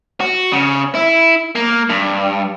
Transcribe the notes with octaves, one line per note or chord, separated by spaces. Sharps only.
F#4
C#3
E4
A#3
G2